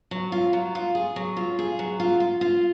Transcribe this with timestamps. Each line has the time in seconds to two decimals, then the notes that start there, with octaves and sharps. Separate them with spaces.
0.11 F#3
0.32 F4
0.53 F#3
0.75 F4
0.95 G#4
1.16 F#3
1.37 F4
1.59 G#4
1.79 F#3
2.00 F4
2.20 F4
2.41 F4